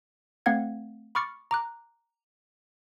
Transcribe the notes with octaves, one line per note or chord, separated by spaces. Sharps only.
A3 C4 F5 F#5 G#6
B5 C#6 D6 F6 A6 C#7
A#5 D6 F#6